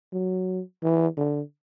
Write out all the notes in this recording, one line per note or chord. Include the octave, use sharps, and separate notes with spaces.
F#3
E3
D3